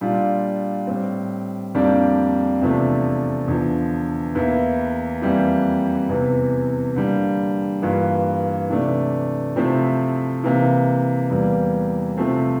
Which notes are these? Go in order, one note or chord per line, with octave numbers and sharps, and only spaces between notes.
A#2 G3 D4 F4
A2 G3 C4
F2 D3 G3 A#3 D4
E2 C3 F3 A3 D4
E2 D3 F3
E2 E3 A#3 E4
F2 E3 G3 A#3 E4
E2 C3 E3
D3 G3 A#3
G2 E3 A#3 F4
C3 E3 A3 D4
C3 F3 A3 C4 E4
C3 E3 A#3 E4
E2 E3 G3 A#3
C3 F3 A3 C4